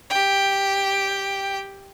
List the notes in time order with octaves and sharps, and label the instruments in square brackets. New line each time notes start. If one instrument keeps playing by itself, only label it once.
[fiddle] G4 G5